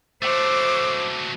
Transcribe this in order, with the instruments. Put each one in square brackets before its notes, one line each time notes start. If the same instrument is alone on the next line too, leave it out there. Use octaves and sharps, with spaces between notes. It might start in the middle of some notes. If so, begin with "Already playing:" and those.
[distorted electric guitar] F#3 A3 [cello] C5 [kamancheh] D6 E6